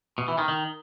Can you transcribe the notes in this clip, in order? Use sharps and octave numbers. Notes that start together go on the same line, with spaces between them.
B2
E3
D#3
D#3